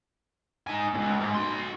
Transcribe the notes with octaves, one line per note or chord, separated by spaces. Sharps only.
D#4 G#5
C#2 A#2
G#2
F#4 C6